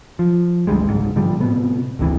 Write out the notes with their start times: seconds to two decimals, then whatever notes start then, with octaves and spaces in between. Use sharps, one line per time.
0.19 F3
0.67 G#1 D2 G3 G#3
0.89 G1 C#2 G#2
1.16 G#2 D3 F3 G3
1.39 A2 C3 B3
1.99 G1 D2 C3 E3